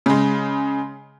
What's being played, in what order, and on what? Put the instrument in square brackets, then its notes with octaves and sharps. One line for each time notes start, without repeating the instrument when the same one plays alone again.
[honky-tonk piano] C#3 G#3